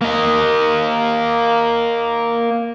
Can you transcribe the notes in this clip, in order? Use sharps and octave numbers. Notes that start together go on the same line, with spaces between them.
A#3 D#5